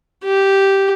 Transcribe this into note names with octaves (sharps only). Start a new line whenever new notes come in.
G4